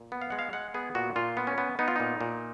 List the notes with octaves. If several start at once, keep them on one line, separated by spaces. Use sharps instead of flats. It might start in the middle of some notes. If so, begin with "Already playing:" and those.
Already playing: A#2
B3
F5
G#3 F#5
F5
G#3 F#5
B3 G#4
A#2 F#4
A#2 F4
B3
C#4
B3
B3 D#4
F4
A#2 D#4
A#2